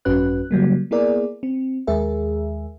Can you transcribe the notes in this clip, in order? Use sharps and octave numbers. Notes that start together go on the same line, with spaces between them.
G#1 F#2 C#4 F#4 B4 F#6
C#3 F#3 G3 A#3
A#3 B3 E4 G#4 A#4 D5
C4
D#2 G#3 G#4 A#4 E5